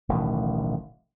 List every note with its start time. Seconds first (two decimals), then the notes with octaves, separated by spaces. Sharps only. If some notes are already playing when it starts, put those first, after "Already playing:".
0.09 D1 A1 B2 D#3